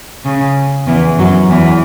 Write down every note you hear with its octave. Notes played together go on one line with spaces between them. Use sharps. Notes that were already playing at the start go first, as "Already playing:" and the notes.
C#3
E2 E3
F#2 F#3
E2 E3